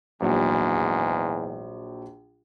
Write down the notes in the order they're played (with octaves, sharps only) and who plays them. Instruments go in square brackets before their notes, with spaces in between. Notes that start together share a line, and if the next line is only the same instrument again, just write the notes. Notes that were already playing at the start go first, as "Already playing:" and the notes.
[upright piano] A#1 F#3 [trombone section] E2 G#2